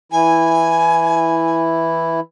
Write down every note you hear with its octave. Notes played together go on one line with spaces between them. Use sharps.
E3 E4 G#5